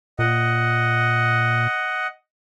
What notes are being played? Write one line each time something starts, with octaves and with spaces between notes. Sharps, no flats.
A#2 D#5 F#5